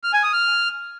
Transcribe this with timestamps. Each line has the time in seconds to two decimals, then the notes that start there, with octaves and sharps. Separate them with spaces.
0.03 F6
0.13 G#5
0.23 D#6
0.33 F6